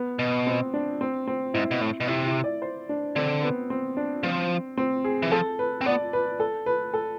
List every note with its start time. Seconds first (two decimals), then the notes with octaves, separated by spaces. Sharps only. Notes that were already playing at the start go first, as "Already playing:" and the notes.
Already playing: B3
0.19 B2
0.47 C4
0.74 D4
1.01 C4
1.27 C4
1.54 G#2 E4
1.71 B2
1.81 A2
2.00 B2
2.08 C3 E4
2.26 E4
2.44 D5
2.62 C5
2.89 D4
3.16 D3 C4
3.43 B3
3.70 C4
3.97 D4
4.23 F3 C4
4.78 C4
5.04 G#4
5.22 E3
5.31 F3 A4
5.59 B4
5.81 C4
5.86 B3 D5
6.13 B4
6.40 A4
6.66 B4
6.94 A4